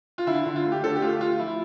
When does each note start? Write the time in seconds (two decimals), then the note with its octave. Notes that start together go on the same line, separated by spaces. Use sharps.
0.18 F4
0.27 D3 E4
0.46 D3
0.56 F4
0.65 A3
0.72 G4
0.83 D3 A4
0.96 G4
1.02 A3 F4
1.21 A3 F4
1.39 F3 E4